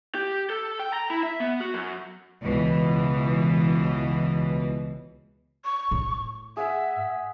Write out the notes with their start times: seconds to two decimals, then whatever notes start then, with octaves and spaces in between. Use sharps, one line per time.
0.15 G4
0.50 A4
0.80 G5
0.93 A#5
1.10 E4
1.23 E5
1.40 B3
1.61 F#4
1.74 F#2
2.42 C#2 B2 E3
5.65 C#6
5.91 A2
6.57 G#4 E5 F#5 E6